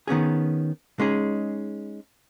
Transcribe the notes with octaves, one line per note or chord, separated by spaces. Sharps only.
D#3 B3 C#4 G#4
G#3 C#4 D#4 G#4